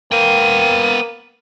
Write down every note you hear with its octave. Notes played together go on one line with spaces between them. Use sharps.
A#3 B3 G5 D#7